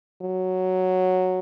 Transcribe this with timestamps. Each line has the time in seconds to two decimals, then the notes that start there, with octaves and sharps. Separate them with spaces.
0.22 F#3